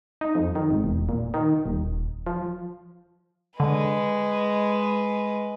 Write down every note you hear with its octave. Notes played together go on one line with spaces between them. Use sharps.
D#4
F2
D#3
G#1
E1
A#2
D#3
D#1
F3
D3 G#3 B4